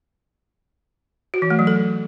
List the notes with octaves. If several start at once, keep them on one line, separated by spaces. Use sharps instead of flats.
F#4
E3
A3
F#3
A4